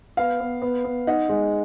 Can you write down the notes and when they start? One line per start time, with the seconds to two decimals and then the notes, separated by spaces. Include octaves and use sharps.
0.17 B3 F5
0.40 B3
0.62 B3
0.85 B3
1.07 D#4 F#5
1.29 G#3